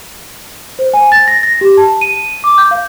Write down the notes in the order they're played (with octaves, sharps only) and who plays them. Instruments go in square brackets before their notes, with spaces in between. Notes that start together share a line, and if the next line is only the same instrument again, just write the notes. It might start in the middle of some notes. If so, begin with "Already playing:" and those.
[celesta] C5
G#5
A6
A#6
A#6
G4
A5
D#7
D6
G6
F5